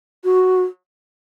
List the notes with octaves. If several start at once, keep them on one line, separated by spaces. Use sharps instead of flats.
F#4